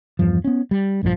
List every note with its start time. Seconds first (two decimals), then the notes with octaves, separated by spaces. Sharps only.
0.19 E2 G2 F3
0.44 B3 C#4
0.71 G3
1.03 A#1 G2 C#3 F3